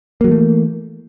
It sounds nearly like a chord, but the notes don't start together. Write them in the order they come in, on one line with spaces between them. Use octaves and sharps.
A#3 F#3 E3 A3